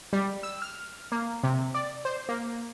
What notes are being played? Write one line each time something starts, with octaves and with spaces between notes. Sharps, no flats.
G3
E6
F6
A#3
C3
D5
C5
A#3